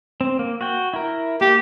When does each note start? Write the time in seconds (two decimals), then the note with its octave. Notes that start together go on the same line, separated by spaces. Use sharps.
0.21 C4
0.39 A#3
0.61 F#4 G5
0.94 E4 A#4
1.41 A#3 G4